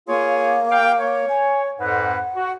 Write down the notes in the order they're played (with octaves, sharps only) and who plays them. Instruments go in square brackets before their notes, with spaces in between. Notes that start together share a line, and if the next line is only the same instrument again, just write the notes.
[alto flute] A#3 [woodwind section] F4 G#4 C#5
[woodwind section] G4 F5 G5
C#5
[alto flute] G#5
[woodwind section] F2 G#2 B4 [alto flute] F#5
[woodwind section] F#4